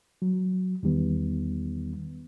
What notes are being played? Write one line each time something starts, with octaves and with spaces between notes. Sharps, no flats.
F#3
E2 D#3 G3 B3